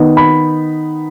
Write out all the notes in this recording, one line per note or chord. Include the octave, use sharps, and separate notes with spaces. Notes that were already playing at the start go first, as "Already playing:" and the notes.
Already playing: D#3 B3 D#4
B5